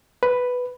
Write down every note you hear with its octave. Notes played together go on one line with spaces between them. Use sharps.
B4